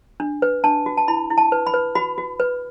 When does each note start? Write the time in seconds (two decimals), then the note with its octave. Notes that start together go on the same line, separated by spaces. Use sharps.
0.20 D4
0.42 B4
0.64 D4 A5
0.86 F#4
0.97 A5
1.08 E4 B5
1.30 E4
1.38 A5
1.52 B4
1.67 B5
1.74 B4
1.95 F#4 B5
2.18 F#4
2.40 B4